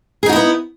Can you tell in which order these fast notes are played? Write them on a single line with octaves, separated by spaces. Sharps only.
G#4 D#4 F#4 E4 B3